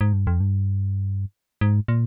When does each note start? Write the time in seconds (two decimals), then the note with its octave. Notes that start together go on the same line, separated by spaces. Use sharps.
0.01 G#2
0.13 G2
0.27 F2
0.40 G2
1.61 G#2
1.88 A#2